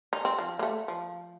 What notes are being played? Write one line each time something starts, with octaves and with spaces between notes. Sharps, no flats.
D#4
C4
F3
A#3
A3
F3